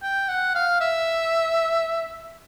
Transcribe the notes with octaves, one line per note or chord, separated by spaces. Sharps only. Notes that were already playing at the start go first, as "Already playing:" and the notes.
G5
F#5
F5
E5